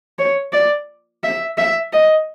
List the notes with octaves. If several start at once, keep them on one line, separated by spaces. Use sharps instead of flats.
C#5
D5
E5
E5
D#5